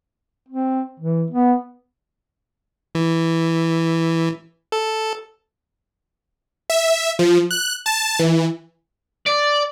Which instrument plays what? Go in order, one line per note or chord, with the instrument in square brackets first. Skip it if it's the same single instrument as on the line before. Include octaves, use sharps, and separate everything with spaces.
[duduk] C4
E3
B3
[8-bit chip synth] E3
A4
[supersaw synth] E5
F3
F#6
A5
E3
[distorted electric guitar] D5